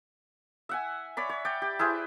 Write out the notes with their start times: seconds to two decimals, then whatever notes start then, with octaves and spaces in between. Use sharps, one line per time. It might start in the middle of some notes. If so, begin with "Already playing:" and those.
0.69 E5 F#5 G#5
1.17 C#5 D5 B5
1.29 C#5
1.45 D5 G5
1.62 G4
1.79 E4 G#4 B4 C5